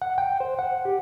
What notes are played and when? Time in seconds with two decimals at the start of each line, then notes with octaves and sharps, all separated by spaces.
0.02 F#5
0.18 G5
0.40 C5
0.59 F#5
0.85 G4